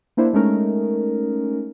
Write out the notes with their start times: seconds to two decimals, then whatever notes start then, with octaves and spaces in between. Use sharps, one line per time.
0.17 A#3 D4 E4 C5
0.33 G#3 A3 C#4 D#4 A#4